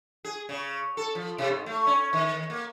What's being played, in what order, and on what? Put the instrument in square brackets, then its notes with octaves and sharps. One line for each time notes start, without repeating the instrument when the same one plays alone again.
[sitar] G#4
C#3
A4
F3
C3
G#2
A3
C#4
D#3
A#3